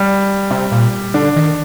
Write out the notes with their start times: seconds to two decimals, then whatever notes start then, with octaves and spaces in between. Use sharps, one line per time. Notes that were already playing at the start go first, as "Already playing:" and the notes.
Already playing: G3
0.51 C3
0.72 A#2
1.14 D3 D4
1.36 D#3